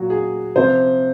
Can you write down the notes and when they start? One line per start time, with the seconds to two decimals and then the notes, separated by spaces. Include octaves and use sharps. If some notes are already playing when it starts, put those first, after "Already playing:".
Already playing: A#2 F#3 F#4
0.10 G#4
0.56 C3 F3 C5